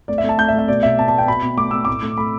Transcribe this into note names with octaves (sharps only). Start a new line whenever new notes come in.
A3 D5
E5
A3
A5
A3 G6
E5
A3
E5
B2 D5
B2 E5
B3 A5
A5
B3
G5
B2 B5
B2
A3 D6
A3 E6
A2 D6
A3
A3 B5